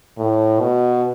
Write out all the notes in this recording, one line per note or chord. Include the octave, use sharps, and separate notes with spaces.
A2
B2